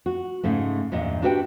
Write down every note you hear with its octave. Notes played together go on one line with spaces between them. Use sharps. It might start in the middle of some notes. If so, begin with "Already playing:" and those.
F#4
G#2 C#3 A3
E2 G2 A#2 D#5
D4 F#4 G4 B4 E5 G5